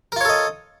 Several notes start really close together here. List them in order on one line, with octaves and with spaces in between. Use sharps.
A#4 F4 C#5 A4 D#5